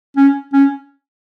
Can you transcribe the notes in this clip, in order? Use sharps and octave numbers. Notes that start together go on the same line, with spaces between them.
C#4
C#4